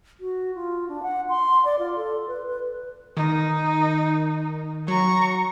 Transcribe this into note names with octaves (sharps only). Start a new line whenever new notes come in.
F#4
F4
D4
F#5
C6
D5
F4
A4
B4
B4
D#3 D#4
F#3 A#5 C#6